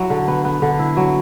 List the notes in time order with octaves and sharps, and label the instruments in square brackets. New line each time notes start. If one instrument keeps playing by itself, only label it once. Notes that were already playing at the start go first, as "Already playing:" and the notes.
Already playing: [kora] F#3 E4
D3
B3
B3
D3
E4
F#3